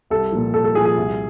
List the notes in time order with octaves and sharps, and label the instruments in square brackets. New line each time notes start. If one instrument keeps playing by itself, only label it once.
[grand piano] C2 A4
A#2 F3
C2 A4
A4
A#2 F3 G#4
G#4
C2